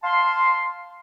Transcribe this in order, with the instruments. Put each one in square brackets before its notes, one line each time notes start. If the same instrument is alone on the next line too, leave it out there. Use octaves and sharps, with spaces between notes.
[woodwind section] F5 A5 C6